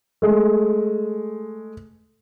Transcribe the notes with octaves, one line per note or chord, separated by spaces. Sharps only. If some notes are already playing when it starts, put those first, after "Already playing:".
G#3 A3